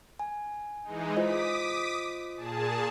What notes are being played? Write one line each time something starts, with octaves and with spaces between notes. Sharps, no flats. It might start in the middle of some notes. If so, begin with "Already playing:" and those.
G#5
E3 G#3 D#4
F4 C5 D#5 D6 D#6 B6
A#2 G#4 A5